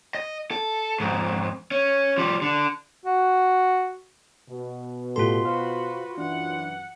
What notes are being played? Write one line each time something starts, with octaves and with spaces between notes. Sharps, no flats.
D#5
A4
F2 G#2
C#4
F3 G3
D3
F#4
B2
A2 F4 G4 A4 C6
F#4 B4 C5 F5
F#2 E3 D4 F#5